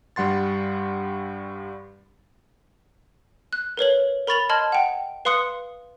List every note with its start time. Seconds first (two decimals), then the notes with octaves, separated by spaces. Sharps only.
0.16 G2 G3 F#5 C6 A6
3.53 F#6
3.77 A#4 B4 C#5 F#7
4.27 A#4 B5 C#6 A6 F7 F#7
4.49 D#5 A5 C6 F6 G#6 F#7
4.72 F#5 G5
5.25 B4 F5 C6 D#6 F#6 C#7